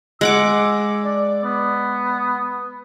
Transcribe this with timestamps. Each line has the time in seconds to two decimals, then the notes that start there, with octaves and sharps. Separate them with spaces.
0.21 G#3 F#5 D6 E6
1.05 D5
1.44 B3